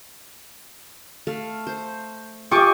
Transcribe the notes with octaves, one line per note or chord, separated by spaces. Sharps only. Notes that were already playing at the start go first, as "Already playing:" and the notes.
A3 F5
C5
F4 G4 D#5 G5 G#5 C#6 D6